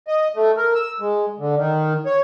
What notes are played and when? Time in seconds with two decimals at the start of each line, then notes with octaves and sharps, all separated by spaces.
0.07 D#5
0.36 A3
0.57 A#4
0.75 E6
1.00 G#3
1.39 D3
1.57 D#3
2.06 C#5